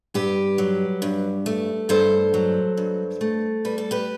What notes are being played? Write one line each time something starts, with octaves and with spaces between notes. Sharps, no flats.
G2 G4 B4
F#3
G2
A3
G2 A4 C5
F#3
G2
A3
G3 B4
A4
G4 B4